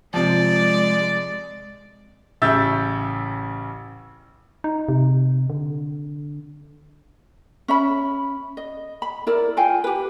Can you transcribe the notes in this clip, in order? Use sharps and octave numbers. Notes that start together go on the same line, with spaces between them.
C3 F3 G#3 D5
A1 C#3 E5 E6 G6 A6
D#4
C3
D3
C#4 E5 B5
D#5
B5
E4 A#4 D5
F4 F5 G5 G#5
G4 B4